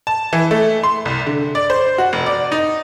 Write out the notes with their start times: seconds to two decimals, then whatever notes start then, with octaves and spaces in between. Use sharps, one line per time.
0.07 A5
0.33 E3
0.51 A3
0.84 C6
1.05 C2
1.26 D3
1.55 D5
1.70 C5
1.98 F#4
2.13 F1
2.26 D5
2.52 D#4